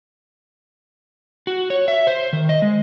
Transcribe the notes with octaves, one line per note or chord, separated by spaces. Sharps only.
F#4
C#5
E5
C5
D#3
D#5
G#3